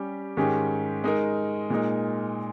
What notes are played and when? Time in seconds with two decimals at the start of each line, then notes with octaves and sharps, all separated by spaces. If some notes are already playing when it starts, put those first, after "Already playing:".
Already playing: G3 C#4 G4
0.37 G#2 D#3 G#3 C#4 G4
1.04 G#3 D#4 A#4
1.70 A#2 G#3 D#4 A#4